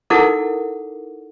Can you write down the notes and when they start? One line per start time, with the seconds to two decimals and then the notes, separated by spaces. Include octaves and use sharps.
0.10 D#4 E4 A4 A#4 F#5 D6